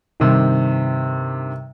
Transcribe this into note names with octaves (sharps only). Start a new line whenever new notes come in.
G2 C3 D#3